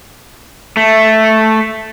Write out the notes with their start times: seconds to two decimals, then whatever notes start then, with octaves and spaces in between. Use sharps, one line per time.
0.77 A3